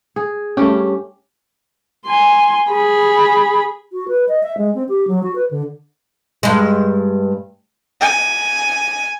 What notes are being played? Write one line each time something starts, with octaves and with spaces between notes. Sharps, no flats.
G#4
G2 A3 C#4 G4
G#5 C6
G#4 B5
F#4
B4
D#5
E5
G#3
C4
G4
F#3
F#4
B4
D3
G2 G#3
G#5